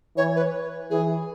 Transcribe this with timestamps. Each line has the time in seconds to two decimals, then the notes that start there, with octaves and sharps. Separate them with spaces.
0.16 E3 C#5
0.36 B4
0.90 E3 G#4